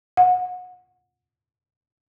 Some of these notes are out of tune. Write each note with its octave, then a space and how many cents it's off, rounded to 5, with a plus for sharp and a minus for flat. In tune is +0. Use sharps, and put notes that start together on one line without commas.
F#5 -30